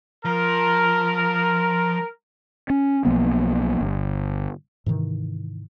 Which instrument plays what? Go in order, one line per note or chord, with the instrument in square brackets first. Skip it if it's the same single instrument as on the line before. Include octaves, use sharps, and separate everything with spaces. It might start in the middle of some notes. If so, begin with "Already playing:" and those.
[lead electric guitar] F3 [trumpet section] A#4
[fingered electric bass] C#4
B1 F3 A#3 B3
G1
[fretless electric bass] G#2 C3 D#3 E3